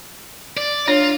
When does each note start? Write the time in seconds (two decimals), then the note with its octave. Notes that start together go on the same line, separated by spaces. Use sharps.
0.57 D5
0.88 D4 F4 C#5